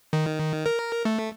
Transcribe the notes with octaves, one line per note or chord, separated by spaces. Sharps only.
D#3
A#4
A3